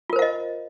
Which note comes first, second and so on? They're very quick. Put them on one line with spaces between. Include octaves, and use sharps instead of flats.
F4 A#4 C5 F5 D#5